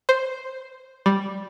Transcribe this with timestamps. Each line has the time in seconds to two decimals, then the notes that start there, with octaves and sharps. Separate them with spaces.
0.09 C5
1.06 G3